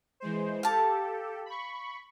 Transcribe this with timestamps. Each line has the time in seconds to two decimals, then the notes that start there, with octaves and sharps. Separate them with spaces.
0.20 E3 G#3 C5
0.63 G4 A4 F5 A5
1.46 B5 C#6